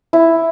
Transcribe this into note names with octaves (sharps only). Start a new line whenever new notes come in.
E4